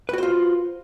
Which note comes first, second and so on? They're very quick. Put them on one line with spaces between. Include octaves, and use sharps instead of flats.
B4 F#4 C5 F4